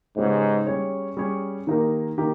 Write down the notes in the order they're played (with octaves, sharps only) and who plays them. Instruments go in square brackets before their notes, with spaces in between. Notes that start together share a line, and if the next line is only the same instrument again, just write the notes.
[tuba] G#2 [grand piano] C#3 G#3 B3 G4 C#5
[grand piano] G3 C#4 G#4 C#5
G3 C#4 G#4 C#5
D#3 A#3 D#4 G4 A#4
D#3 A#3 D#4 G4 A#4